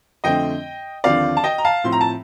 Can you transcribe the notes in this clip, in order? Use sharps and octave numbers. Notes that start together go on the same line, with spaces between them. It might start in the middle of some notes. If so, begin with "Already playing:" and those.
F2 D3 A3 C4 D#5 G5
D#2 D3 F3 C4 D5 F5
A5
D#5 G5
A#5
F5 A5
A2 F3 C4 C6
A#5
A5